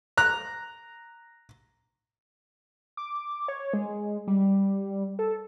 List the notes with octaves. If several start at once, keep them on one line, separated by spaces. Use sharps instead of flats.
A#5 F#6
D6
C#5
G#3
G3
A4